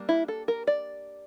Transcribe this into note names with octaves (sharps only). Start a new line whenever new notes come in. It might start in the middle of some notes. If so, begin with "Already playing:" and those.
Already playing: G3 A#3 D4
E4
A4
A#4
D5